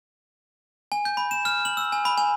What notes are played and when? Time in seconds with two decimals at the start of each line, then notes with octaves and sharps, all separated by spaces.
0.92 G#5
1.05 G6
1.17 B5
1.31 E7
1.45 F6
1.65 F#7
1.77 E6
1.92 G#5
2.05 B5
2.18 G#5